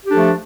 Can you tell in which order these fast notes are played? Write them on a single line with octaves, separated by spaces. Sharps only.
G4 D4 A4 F3 A3